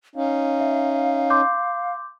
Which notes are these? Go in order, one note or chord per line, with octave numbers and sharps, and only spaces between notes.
C#4 D#4 F5
E5
C6 D6 G6